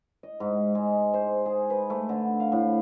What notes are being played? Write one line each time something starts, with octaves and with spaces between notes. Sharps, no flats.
D#5
G#2
G#3
C5
G#4
B4
A3
D3
F5
A2